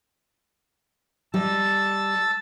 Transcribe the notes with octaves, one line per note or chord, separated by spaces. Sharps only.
G3 D#5 A5 E6 A6